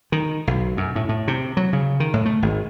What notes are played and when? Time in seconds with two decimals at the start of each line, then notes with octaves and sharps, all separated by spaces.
0.12 D#3
0.47 B1
0.77 F#2
0.96 A2
1.09 A2
1.28 C3
1.57 F#3
1.73 C#3
2.00 D#3
2.13 A2
2.26 A3
2.42 G#1